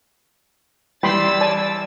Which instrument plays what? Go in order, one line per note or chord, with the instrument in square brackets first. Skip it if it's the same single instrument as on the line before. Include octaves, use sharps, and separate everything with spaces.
[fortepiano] E3 [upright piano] G3 [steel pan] G5 B5 C6 [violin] E6 A6
[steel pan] D5 G#5 A5